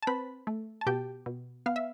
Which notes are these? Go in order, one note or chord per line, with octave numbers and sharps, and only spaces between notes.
A5
C4 B4 B5
A3
A5
B2 G4 G5
B2
B3 F5
E5